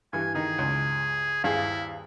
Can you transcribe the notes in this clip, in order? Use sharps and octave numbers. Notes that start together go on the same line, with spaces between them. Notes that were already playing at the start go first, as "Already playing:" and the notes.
G2 E3 G#5
D#3 D#4 G#4
C#2
D#1 G2 E4 G#4 F5